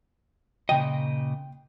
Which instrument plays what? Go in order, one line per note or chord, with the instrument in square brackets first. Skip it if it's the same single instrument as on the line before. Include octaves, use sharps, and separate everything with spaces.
[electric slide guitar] A#2 C#3 D#5 [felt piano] G5